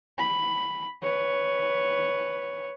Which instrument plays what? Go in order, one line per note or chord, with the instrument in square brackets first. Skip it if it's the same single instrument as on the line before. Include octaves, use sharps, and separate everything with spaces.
[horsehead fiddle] B5
B4 C#5